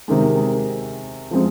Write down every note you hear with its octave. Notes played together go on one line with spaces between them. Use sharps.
C3 D#3 G#3
F3 G#3 C4